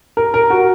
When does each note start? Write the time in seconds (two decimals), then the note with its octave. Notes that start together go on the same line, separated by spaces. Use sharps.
0.17 A#4
0.34 A#4
0.50 F#4